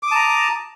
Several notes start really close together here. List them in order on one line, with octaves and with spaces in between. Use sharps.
D6 D#6 A5 A#5